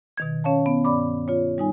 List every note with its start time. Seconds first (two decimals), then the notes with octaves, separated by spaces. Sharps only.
0.17 B2 D#3 G#6
0.44 C#4 C#5 F5 A5
0.66 B3 C#4
0.84 G2 D5 B5 D6
1.28 F4 C#5
1.58 G3 D#4 G#5